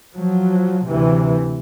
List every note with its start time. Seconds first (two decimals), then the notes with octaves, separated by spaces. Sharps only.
0.14 F3 F#3
0.87 D2 C3 E3